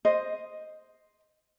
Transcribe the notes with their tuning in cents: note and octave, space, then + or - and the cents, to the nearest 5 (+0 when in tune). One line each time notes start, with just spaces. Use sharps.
C5 +0 D#5 +0